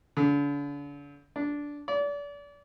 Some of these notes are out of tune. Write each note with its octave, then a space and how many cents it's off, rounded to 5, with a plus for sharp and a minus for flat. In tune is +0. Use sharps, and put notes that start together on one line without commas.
D3 -40
D4 -10
D5 -35